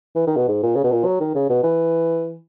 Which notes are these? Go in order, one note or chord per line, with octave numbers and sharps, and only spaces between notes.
E3
D#3
B2
G#2
A#2
C#3
B2
A#2
F#3
D#3
C#3
B2
E3